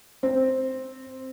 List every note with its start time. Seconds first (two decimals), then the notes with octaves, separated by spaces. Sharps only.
0.23 C4